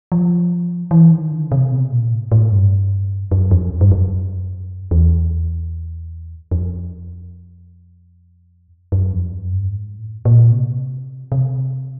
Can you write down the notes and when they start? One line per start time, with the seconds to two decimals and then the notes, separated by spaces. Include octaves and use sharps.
0.12 F3
0.91 E3
1.11 D#3
1.32 D3
1.52 C3
1.72 B2
1.91 A#2
2.11 A2
2.32 A2
2.51 G2
3.31 F#2
3.51 F2
3.81 G2
3.91 F#2
4.91 E2
6.51 F2
8.92 F#2
9.12 F2
9.32 F#2
9.51 G2
9.72 G#2
9.98 A2
10.25 A#2
10.52 C3
11.32 C3